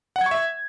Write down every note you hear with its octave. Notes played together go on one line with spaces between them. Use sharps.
F#5
G#6
C#6
E5